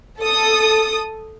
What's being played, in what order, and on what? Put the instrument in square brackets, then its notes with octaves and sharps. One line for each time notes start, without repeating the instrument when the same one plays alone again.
[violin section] A4 D#6